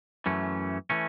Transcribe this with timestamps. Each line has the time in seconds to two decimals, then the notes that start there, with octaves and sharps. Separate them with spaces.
0.26 F#2 E3 A3 C#4
0.90 E3 A3 C#4